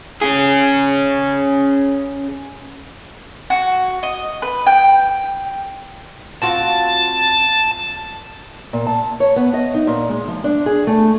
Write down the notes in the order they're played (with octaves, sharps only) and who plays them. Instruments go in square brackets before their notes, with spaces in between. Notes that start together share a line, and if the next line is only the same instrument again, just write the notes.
[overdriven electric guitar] C#4 G#4
[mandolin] F#4
D#5
B4
G5
[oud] C4 F4 F#4 [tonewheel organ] A5
[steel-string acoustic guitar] A#2
A5
C#5
B3
D#5
D#4
A#2
G#3
F3
D4
G#4
A3